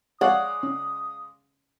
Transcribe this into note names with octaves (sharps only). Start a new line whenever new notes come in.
G#3 C#5 D5 F5 F#5 D#6
C#4